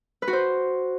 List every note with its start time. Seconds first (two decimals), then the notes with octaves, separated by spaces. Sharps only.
0.22 B4
0.28 F#4
0.33 C5